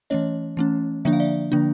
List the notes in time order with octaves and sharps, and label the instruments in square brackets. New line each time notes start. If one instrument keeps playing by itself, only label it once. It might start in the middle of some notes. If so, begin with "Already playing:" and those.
[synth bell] E3 A3 C#4 C#5 D#5
E3 A3 C#4
D3 F3 A#3 D4 E5
F5
D5 E5
D3 F3 A#3 D4